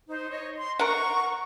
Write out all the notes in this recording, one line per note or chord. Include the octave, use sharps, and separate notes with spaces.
D#4 C5
C#5 D#5
C6
A#4 F#5 A#5 C#6